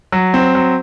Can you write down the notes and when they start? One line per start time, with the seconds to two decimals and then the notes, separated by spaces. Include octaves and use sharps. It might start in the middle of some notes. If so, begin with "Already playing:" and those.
0.12 F#3
0.34 C4
0.55 F#3